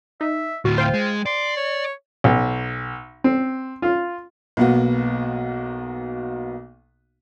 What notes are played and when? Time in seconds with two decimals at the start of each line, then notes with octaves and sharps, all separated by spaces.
0.21 D#4 E5
0.65 D2 A2 F4 F#4
0.78 C5 F5 G5
0.94 G#3
1.26 D5 C6
1.56 C#5
2.24 B1
3.24 C4
3.82 F4
4.57 B1 A#3 B3 F#4